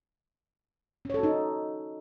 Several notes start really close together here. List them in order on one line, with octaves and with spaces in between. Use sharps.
C#4 C#5 A4 F#4 D#4